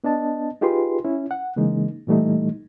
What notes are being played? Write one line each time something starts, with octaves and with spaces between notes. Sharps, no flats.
B3 D4 D#5 A5
D#4 F4 G4 G#4 B4 C6
C#4 E4
F#5
C#3 E3 G#3 A#3 D#4
A#2 E3 G3 A3 D#4